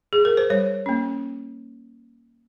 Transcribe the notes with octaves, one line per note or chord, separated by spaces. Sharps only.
G#4
A#4
C5
G3 C#5
A#3 C#4